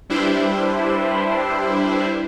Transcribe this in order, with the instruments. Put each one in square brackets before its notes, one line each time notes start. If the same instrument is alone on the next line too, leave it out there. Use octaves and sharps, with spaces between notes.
[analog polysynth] G3 D4 E4 G4 B4 C5